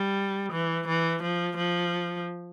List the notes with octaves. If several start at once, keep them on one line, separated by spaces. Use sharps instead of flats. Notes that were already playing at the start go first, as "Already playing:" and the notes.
Already playing: G3
E3
E3
F3
F3